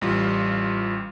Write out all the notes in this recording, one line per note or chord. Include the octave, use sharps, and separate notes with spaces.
A1 G3 F4